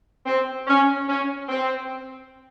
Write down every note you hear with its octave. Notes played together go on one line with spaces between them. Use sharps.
C4
C#4
C#4
C4